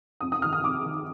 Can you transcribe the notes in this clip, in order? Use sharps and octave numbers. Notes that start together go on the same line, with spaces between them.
F2 D#6
D#6
C3 D#3 F6
D#6
F2 D6
C3 D#3